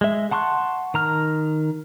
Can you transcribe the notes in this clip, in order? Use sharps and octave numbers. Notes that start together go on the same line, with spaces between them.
G#3 E5
F#5 A5 C6 C#6 F#6
D#3 A#5 F6